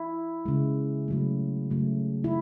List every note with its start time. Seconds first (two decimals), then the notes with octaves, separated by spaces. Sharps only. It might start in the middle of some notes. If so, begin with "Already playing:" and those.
Already playing: E4
0.45 C#3 G#3
1.08 C#3 F#3 A3
1.70 C#3 F#3 A3
2.24 E4